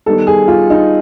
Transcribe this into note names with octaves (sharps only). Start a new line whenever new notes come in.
D#3 G3 B3 A4
G#4
F4
D#4